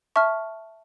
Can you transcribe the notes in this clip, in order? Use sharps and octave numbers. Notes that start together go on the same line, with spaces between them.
E5 A5 C#6 F6